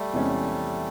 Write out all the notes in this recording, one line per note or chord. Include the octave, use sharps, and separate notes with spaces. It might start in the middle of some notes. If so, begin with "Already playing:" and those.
Already playing: G3 A3
E2 C3 E3 G#3 C#4